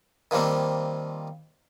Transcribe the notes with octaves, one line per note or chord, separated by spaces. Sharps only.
D#3 F3 G3 A#3 C4